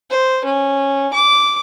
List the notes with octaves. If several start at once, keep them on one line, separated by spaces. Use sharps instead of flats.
C5
C#4
D6